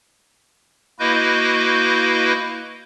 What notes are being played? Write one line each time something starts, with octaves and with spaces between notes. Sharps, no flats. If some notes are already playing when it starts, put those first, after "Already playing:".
A#3 E4 F#4 B4 D#5 G6